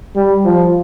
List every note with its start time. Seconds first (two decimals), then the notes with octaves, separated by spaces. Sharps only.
0.16 G3
0.44 F3